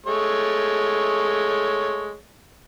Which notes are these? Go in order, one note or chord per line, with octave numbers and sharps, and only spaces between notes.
G#3 A3 C#5